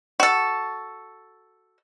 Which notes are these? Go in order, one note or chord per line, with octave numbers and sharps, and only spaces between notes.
F#4 A4